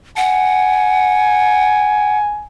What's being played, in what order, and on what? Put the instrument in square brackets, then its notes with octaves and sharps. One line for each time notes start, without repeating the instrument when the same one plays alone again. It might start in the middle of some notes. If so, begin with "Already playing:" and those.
[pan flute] F#5 [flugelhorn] G#5